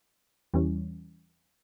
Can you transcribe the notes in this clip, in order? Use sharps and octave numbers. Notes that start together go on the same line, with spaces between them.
E2 E3 G3 C#4